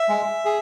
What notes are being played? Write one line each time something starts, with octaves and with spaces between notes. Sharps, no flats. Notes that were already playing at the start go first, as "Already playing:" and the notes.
Already playing: E5
G#3
G#4